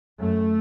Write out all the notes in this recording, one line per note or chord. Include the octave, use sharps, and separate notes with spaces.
F#2 A3